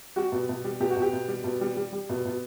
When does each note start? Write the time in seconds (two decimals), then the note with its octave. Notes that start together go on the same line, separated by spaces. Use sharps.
0.16 G3 F#4
0.32 B2
0.49 B2
0.64 G3
0.80 B2 G4
0.90 F#4
0.96 B2
1.02 G4
1.13 B2
1.28 G3
1.44 B2
1.61 G3
1.76 G3
1.92 G3
2.09 B2
2.25 B2